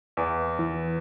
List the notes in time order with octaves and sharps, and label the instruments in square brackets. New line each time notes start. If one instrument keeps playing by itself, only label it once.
[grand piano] E2
[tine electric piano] E3